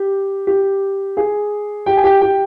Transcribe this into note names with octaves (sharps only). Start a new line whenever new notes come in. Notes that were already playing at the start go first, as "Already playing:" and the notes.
Already playing: G4
G4
G#4
G4 G5
G#5
G4 G5
G4 G5